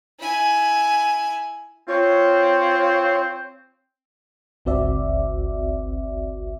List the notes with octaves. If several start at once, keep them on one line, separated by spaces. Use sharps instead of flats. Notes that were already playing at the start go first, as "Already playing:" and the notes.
E4 G#5
C4 F4 C#5
G1 C#2 C4 F#4 D5 E5